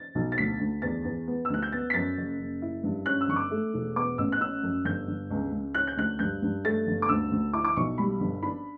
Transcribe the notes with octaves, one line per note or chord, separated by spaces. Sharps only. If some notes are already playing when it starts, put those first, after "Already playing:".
Already playing: A6
B1
A6
D2 B6
D2
E2 A6
E2
B3
E6
D2 F#6
G6
B3 A6
B6
F#2 A6
F#1
F#1
E4
G2
C#4 F#6
E6
G1 C#6
D6
A3
E1
B3 D6
A1 E6
F#6
C#4 E6
F#2
G1 G6
G1
C#2
C#2
C#4 F#6
G6
D2 F#6
G2 G6
G2
A3 A6
G1
D6
D2 E6
D2
E4 D6
D6
B1 C#6
G3 B5
G1
D4 B5